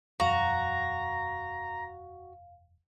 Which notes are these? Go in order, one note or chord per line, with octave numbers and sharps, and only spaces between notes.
E1 F#2 F#4 F5 A#5